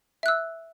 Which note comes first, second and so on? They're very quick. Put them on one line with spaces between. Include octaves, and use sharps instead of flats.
E5 F#6 E6